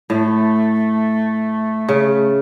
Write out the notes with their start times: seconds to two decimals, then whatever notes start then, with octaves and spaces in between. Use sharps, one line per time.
0.10 A2 A3
1.89 C#3